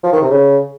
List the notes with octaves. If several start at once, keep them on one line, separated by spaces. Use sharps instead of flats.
F3
D#3
C3
C#3